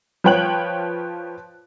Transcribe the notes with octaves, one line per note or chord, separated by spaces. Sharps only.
F3 B4 C#5 G5 F#6 F#7